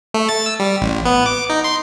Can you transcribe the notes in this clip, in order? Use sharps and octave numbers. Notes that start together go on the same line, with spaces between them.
A3
A6
E6
G3
A1
B3
D6
D#4
C6